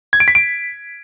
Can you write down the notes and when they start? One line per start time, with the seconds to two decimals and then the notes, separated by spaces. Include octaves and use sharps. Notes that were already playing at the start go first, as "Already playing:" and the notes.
0.13 G#6
0.20 D7
0.28 B6
0.35 D7